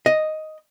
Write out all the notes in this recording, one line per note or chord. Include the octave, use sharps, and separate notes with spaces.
D#5